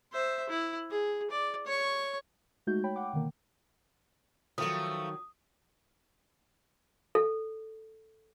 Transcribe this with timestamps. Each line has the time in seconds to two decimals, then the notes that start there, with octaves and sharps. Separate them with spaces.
0.12 C5 E5
0.49 E4
0.90 G#4
1.31 D5
1.66 C#5 C#6
2.67 G#3 A3 D#4 F#4 G6
2.84 C#5 G5 B5
2.96 F#5 G5 D6
3.13 B2 D3 D#3 A#3
4.58 D#3 F3 F#3 A3 D#6
7.15 A4